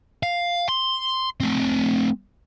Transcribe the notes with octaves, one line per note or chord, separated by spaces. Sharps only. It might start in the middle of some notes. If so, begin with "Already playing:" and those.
F5
C6
A3 C4